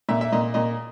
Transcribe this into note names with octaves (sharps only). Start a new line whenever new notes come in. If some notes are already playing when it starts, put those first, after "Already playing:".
A#2 E5
E5
A#2 D#5
A#2 D#5